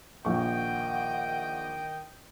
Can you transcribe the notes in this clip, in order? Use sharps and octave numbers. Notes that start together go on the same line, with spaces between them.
A#1 D#3 D#5 F#5 G5 C#6